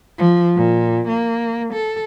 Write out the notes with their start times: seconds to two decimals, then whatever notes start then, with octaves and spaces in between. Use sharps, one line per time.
0.18 F3
0.56 A#2
1.08 A#3
1.73 A4